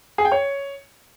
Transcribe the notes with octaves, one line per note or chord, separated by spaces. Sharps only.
G#4
G5
C#5